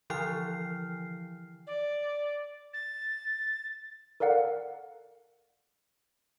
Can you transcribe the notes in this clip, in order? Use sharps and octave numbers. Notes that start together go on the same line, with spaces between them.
D3 E3 F3 E4 F6 C7
D5
A6
A4 A#4 D5 F5 F#5